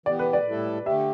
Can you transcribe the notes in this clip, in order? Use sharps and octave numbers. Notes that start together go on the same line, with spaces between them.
E3 B3 G4 D5
B4
D5
A2 G3 E4 A4
D3 A3 G4 E5